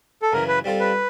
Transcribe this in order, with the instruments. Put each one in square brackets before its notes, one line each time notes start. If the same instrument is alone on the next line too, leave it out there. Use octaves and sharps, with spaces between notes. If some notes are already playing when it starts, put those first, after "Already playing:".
[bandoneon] A4
[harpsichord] F#2 C#3 E3 [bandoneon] A#4
[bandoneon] B4
[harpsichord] G3 C4 F4 A4 C5
[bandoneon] B4